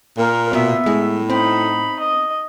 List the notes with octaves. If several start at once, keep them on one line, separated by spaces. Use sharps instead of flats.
A#2 A#3 A#4
B2 B3 E5
A2 G#3
C4 D#4 B5
D#5